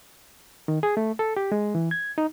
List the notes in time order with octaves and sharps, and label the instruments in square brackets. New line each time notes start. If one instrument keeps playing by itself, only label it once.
[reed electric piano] D#3
G#4
A3
A4
G4
G#3
E3
G#6
D#4